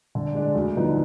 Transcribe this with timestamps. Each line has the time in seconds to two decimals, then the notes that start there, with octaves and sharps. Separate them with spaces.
0.15 D3
0.35 G#3 D4
0.55 D2
0.77 D3 F3 B3 D#4